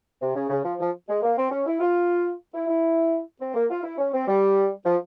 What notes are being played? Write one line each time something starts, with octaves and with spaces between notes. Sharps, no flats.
C3
C#3
C#3
F3
F3
G#3
A#3
C4
C#4
E4
F4
E4
E4
C4
A#3
F4
E4
C#4
C4
G3
F3